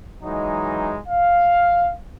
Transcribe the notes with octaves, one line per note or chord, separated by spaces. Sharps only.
E3 F#3 G#3 D#4
F5